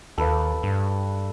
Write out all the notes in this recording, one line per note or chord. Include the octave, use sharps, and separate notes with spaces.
D#2 A4 B4 F5
G2